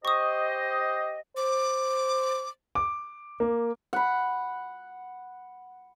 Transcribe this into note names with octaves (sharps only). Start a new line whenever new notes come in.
G4 C5 D#5 C#6 D#6
C5 D6
D6
A#3
F#5 B5